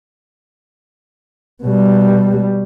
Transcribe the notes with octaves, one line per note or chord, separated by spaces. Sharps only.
B2 G3